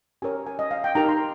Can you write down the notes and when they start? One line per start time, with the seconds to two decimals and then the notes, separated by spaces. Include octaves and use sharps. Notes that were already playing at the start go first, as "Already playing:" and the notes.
0.22 C#4 G4 A#4 C#5 G#5
0.47 G#5
0.59 D#5
0.71 F5
0.84 G5
0.95 D#4 G4 A#4 A#5
1.09 C6